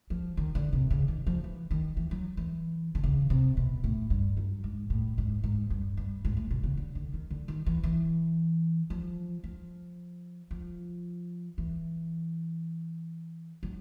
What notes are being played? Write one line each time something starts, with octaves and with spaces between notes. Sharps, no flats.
F3
D#3
D3
C3
C#3
D#3
F3
E3
D#3
E3
F#3
E3
D3
C#3
C3
B2
A2
G2
F#2
G#2
A2
G#2
G#2
G2
G2
G#2
A2
B2
C#3
D3
D3
D#3
D3
D#3
E3
E3
F3
F3
F3
E3
F#3